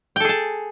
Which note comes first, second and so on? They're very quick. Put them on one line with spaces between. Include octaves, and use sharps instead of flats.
G5 A4 G#4 A5